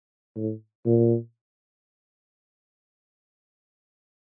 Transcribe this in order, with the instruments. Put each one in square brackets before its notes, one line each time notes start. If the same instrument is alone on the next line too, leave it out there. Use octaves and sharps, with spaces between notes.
[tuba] A2
A#2